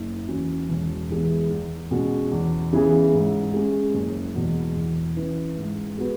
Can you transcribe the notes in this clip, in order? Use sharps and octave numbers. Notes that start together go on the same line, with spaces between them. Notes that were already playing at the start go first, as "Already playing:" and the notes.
Already playing: F#1
E2 E3 C#4 F#4
E1
E2 E3 G#3 B3
E2
B2 G#3 C#4 F#4
E2
C#3 E3 B3 G#4
G#2
G#3 C#4
F#1
E2 B2 G#3
E2
E3 C#4 E4 B4
G#2
G#3 B3 F#4 B4